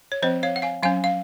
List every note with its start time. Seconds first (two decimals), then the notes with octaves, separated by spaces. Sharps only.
0.12 C#5
0.22 F3 C4 C5 D#5
0.43 C#5 F5
0.56 F#5
0.62 F5 G#5
0.83 F#3 C#4 F5 G#5
1.04 F5